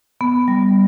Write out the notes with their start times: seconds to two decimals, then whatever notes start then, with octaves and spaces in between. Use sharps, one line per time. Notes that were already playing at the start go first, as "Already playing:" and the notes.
0.21 B3
0.48 G3